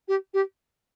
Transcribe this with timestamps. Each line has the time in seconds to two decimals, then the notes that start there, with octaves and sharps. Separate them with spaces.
0.08 G4
0.34 G4